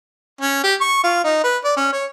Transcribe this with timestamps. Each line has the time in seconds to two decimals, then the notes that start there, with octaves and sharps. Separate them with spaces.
0.41 C#4
0.63 G4
0.81 C#6
1.03 F4
1.24 D#4
1.43 B4
1.64 D5
1.77 C#4
1.92 C#5